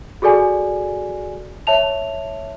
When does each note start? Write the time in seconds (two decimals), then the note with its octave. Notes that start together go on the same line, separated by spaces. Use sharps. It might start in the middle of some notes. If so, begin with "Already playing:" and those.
0.22 F#4 G#4 A4 D5 G#5
1.67 C#5 E5 A5 F7